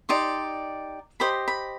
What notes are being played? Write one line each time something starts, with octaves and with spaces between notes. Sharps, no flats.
D#4 G4 D5 C6
G4 C5 D#5 B5
B5